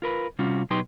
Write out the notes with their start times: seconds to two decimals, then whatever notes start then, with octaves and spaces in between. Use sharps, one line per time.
0.02 F4 A#4 B4
0.39 C3 G3 C#4 F4 F#4
0.70 B2 F#3 D#4 G4 B4 C6